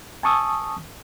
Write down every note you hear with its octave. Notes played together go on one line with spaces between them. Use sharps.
G#5 A5 C#6 D#6 E6